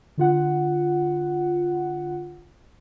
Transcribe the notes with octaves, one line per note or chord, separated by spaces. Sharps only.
D3 F4 F#5